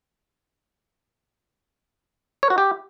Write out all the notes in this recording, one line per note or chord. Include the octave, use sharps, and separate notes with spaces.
C#5
F#4
G4